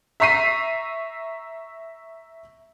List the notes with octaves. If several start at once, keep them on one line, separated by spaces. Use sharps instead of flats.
E5 A#5 C#6 B6 C7 D#7